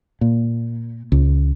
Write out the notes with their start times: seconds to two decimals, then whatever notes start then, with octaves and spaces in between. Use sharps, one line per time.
0.21 A#2
1.12 C#2